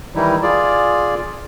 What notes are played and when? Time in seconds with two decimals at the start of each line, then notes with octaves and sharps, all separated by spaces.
0.15 D#3 E3 G3 D#4 E4
0.42 F4 G#4 D5